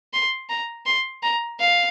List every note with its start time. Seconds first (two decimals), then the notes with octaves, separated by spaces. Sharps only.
0.13 C6
0.50 A#5
0.86 C6
1.23 A#5
1.60 F5